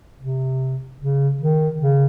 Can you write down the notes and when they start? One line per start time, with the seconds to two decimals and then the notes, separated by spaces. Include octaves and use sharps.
0.20 C3
1.00 C#3
1.41 D#3
1.81 C#3